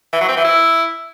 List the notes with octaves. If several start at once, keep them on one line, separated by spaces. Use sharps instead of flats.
E3
F#3
C4
E3
E4